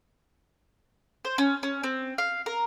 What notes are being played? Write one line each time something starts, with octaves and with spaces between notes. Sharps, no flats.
C5
C#4
C#4
C4
F5
A#4